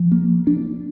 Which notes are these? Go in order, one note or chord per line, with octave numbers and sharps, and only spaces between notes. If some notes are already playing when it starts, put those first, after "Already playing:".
Already playing: F3
A#3
D4